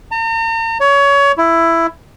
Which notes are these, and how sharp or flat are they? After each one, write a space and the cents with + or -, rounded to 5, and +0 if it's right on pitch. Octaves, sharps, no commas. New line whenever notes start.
A#5 -45
C#5 +25
E4 +10